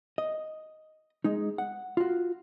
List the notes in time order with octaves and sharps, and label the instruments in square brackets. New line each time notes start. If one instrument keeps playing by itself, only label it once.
[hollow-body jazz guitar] D#5
G#3 D#4
F#5
F4 F#4